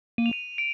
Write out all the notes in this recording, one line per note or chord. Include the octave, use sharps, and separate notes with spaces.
A#3 D#7
F7
D#7
D7